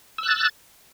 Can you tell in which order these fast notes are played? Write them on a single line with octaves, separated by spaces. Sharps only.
E6 F#6 A6